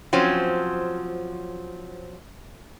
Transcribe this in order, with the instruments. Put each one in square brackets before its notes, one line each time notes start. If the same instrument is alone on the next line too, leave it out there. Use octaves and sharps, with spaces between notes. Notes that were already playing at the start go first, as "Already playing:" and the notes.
[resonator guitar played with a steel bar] F3 F#3 C4 C#4